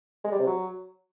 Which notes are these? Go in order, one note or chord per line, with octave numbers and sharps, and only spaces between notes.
G#3
G3
C3
F#3